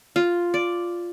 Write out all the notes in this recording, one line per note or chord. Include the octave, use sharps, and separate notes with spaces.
F4
D5